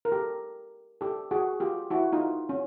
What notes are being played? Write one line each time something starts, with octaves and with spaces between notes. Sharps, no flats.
A#4
G4 A4
G4 A4
F#4 G#4
F4 G4
E4 F#4
D#4 F4
C#4